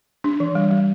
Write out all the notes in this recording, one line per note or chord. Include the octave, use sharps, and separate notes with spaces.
D4
E3
G3
G3